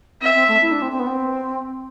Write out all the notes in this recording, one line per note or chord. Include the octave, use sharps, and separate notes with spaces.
C4 E5
C4
A3
E4
D4
C4
C4
B3
C4